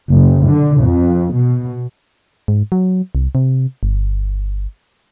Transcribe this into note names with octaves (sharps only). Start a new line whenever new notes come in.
F#1
D3
F2
B2
G#2
F#3
C2
C3
G1